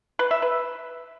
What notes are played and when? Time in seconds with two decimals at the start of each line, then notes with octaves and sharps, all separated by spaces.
0.19 B4
0.31 E5
0.42 B4